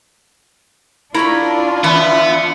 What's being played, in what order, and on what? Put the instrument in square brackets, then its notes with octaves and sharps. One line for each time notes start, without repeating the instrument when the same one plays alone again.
[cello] D4 F4 [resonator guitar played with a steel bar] E4 A#5 [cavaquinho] A#4 C#5 B5
[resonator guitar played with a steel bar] E3 [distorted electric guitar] B3 [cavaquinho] E5